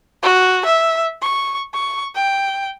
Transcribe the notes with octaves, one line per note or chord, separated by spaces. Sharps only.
F#4
E5
C#6
C#6
G5